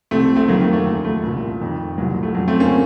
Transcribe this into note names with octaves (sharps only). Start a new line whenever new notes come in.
C2 C3 F3 A3 C4
A3 C4
F2 D#3 F#3 A#3
A3
A3
D#2 C#3 F3
A3
C2 A#2 F3
F2 D#3
C2 A#2 F3 F#3
A3
F2 C#3 F3 F#3
A3 C4
A#3 C#4